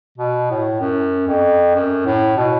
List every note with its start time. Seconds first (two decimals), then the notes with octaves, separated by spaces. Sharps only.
0.18 B2
0.50 A2
0.81 F#2
1.27 F2
1.75 F#2
2.06 A2
2.37 B2